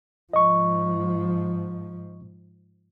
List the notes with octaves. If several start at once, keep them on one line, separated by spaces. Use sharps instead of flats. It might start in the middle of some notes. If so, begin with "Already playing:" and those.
G#2 F3 D#5 C#6